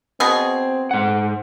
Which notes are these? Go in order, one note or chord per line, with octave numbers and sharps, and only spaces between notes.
B2 C4 G#4
G#2 F#5